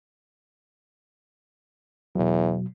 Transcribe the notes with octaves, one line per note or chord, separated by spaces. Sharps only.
E2 B2 F#3